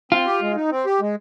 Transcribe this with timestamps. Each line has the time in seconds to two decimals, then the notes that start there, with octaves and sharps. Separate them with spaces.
0.12 C4 F4
0.26 G4
0.41 G#3
0.56 D#4
0.71 C4
0.86 G4
1.01 G#3